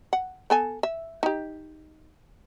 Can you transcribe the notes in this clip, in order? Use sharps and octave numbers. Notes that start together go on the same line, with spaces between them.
F#5
B3 A4 G#5
E5
D#4 G4